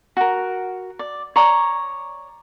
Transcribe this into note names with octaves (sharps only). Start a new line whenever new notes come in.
F#4 A#4
D5
C#5 D5 A#5